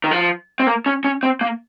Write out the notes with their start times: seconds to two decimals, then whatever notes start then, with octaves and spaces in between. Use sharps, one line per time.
0.04 D#3
0.11 F3
0.60 C4
0.67 A#3
0.86 C#4
1.04 C#4
1.23 C4
1.41 A#3